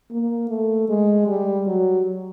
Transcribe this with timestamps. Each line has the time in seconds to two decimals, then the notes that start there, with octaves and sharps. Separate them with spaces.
0.11 A#3
0.50 A3
0.89 G#3
1.27 G3
1.67 F#3